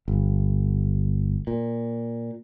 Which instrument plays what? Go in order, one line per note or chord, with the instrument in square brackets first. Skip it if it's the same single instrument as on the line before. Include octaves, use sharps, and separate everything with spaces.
[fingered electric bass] G1
A#2